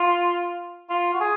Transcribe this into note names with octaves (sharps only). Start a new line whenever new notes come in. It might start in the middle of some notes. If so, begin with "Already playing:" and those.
Already playing: F4
F4
F#4
G#4